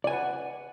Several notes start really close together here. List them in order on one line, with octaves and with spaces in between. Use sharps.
D5 G#5 B4 F#5